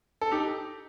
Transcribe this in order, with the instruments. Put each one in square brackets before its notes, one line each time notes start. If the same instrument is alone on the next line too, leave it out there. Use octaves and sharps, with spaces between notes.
[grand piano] A4
D#4 G4